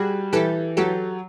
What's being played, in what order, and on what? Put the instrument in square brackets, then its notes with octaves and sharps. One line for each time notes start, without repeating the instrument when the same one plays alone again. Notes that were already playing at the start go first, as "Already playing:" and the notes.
Already playing: [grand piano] G3 [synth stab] F#4 G#4
[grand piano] E3 [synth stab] G4 A4
[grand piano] F#3 [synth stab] G4 A4